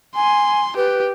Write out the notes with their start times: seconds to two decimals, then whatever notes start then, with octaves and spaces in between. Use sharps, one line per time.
0.16 G#5 C6
0.76 G4 B4